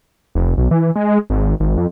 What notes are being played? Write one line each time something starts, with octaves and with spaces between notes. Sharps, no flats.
F1
B1
E3
G#3
G#1
G#1
F2